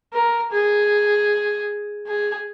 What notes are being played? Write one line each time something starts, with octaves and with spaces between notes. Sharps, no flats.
A#4
G#4
G#4